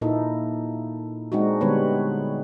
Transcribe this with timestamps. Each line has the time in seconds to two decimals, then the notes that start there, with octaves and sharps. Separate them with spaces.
0.01 A#2 A#3 D#4 E4 A4
1.32 G#3 C4 D4 D#4 F#4
1.61 D3 G3 G#3 B3 B4 C#5